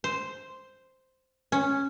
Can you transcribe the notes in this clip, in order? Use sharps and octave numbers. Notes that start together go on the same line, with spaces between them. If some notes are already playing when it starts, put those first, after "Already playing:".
C5
C#4